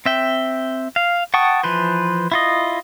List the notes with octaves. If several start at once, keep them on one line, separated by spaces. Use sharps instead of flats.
C4 E5 G5
F5
F#5 G5 A5 C#6 D#6
E3 F3 B4 C5
E4 F4 D#5